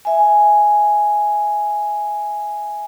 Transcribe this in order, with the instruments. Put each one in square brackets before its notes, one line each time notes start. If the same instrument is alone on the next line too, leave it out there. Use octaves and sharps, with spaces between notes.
[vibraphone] E5 G#5